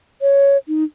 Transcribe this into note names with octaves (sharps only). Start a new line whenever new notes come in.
C#5
D#4